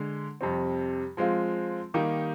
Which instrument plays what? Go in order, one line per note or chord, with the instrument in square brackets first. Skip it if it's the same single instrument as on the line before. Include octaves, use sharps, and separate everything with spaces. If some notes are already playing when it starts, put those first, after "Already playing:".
Already playing: [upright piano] D3 G#3
F2 C3 G3 C4
F3 G#3 C4 F4
D#3 G3 A#3 D#4 G4